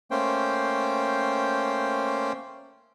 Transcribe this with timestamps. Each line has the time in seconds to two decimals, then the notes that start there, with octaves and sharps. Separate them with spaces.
0.11 A3 A#3 C#4 C5 G5